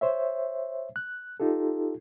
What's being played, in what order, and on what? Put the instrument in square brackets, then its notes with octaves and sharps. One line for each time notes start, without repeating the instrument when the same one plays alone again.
[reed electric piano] C5 C#5 E5
F#6
D#4 F4 G4 A4